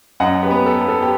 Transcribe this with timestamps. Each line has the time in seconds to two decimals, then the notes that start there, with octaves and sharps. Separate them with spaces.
0.20 F#2 D#5 F#5
0.43 G4 B4
0.51 B3
0.66 A4
0.81 B3
0.89 A4
1.02 G4